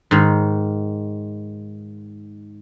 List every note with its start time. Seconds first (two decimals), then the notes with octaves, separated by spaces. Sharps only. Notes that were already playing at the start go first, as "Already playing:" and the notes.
0.11 G#2 D#3